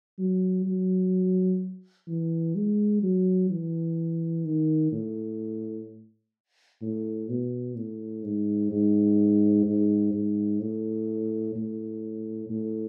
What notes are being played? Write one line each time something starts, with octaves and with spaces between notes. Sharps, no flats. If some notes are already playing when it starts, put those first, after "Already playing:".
F#3
F#3
E3
G#3
F#3
E3
D#3
A2
A2
B2
A2
G#2
G#2
G#2
G#2
A2
A2
A2